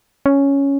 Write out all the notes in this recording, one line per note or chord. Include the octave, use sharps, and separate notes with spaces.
C#4